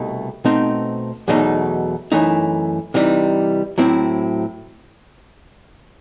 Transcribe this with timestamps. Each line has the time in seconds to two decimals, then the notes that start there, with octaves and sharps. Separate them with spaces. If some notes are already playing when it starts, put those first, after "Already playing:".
Already playing: C2 B2 A3 D#4
0.45 B2 A3 C4 D#4
1.28 E2 B2 F#3 A3 D#4
2.12 F#2 E3 A3 D#4
2.94 C3 E3 G3 D#4
3.78 A2 F#3 C4 E4